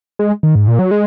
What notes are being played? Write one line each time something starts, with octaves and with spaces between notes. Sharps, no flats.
G#3
D#3
G#2
A#2
F#3
G#3